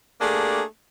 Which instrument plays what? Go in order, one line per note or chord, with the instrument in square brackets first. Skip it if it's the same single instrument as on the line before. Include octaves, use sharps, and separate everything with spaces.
[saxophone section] A3 A#3 D4 G4 G#4